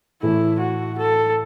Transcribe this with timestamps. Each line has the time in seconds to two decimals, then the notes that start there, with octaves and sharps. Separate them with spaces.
0.22 A2 E3 A3 E4
0.60 F#4
0.98 A4